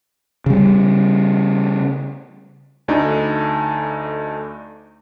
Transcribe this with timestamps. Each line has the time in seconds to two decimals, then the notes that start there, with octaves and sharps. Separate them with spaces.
0.46 C#3 G3
2.88 D2 A3 D4 D#4